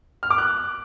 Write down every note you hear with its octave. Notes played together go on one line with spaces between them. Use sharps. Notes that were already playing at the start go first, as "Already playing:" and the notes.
F6
D6
F#6